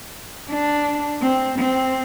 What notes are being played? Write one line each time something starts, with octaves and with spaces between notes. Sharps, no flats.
D4
C4
C4